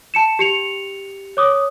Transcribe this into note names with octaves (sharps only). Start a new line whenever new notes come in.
A5 C#7 E7
G4 C#7 F7
C#5 D6 D#6